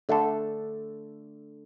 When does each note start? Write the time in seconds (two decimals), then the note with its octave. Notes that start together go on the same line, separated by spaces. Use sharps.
0.09 D3 A3 D4 A4